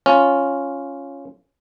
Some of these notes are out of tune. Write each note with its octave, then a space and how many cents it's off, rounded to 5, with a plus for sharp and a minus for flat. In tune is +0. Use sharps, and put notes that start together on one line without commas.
C#4 +0 F4 +0